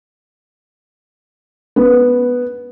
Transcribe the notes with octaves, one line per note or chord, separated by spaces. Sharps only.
B3